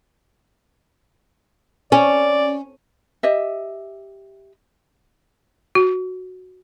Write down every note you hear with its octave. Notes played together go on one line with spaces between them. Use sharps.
C#4 D5
G4 D#5 E5
F#4